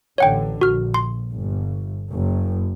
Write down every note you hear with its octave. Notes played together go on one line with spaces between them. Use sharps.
A1 D3 C#5 F#5 G5
A#1 F#4 F6
C6
G1
F#1 F#2